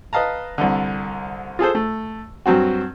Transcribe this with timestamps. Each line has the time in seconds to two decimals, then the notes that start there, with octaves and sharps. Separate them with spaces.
0.13 B4 D#5 F5 A5 A#5
0.58 C2 D3
1.59 F4 G#4 A4 C5
1.75 A3
2.46 G2 F#3 C4 F#4